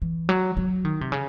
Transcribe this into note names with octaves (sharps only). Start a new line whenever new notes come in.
E3
F#3
F#3
D#3
C3
C#3